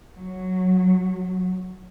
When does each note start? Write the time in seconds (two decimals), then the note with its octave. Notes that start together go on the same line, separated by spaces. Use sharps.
0.15 F#3